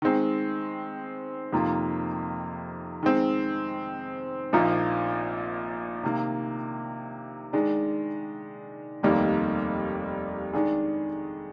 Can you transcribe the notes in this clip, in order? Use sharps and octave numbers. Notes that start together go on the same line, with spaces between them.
D#3 G#3 C4
F2 C3 D#3 A#3 F4
D#3 G#3 C4
A#1 A#2 F3 A#3 D#4
C3 D#3 A#3
D#3 G#3 D4
F1 D#2 D#3 G3 A#3
D#3 G#3 D4 G#4